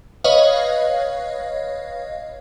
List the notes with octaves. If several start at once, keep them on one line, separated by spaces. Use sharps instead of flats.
B4 C#5 D#5 F5